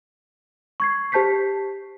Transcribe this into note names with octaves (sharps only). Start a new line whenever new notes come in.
C#6 G#6 C7
G4 C5 A5 G6 B6 C7